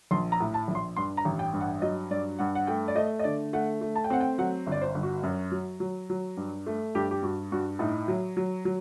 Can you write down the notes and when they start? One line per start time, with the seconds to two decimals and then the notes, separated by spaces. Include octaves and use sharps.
0.11 A#1 C6
0.32 A#5
0.40 A2
0.54 A5
0.68 A#1
0.75 C6
0.96 G2 C6
1.17 A#5
1.25 A1
1.39 G5
1.53 G2
1.61 F#5
1.82 F#3 D#5
2.11 G2 D5
2.39 G2 F#5
2.55 F#5
2.67 A3 G5
2.88 D5
2.95 A3 D#5
3.19 D#5
3.24 D3 D5
3.53 A3 F#5
3.81 A3
3.96 A5
4.04 G5
4.10 C4 F#5
4.20 G5
4.38 F#3 F#5
4.67 G1
4.72 D5
4.82 C5
4.95 G1
5.03 F#4
5.23 F#2
5.52 F#3
5.80 F#3
6.10 F#3
6.37 G2
6.66 A3
6.95 G2 G4
7.11 G4
7.23 G2 F#4
7.52 G2 F#4
7.79 A2 D#4
8.08 F#3
8.37 F#3
8.65 F#3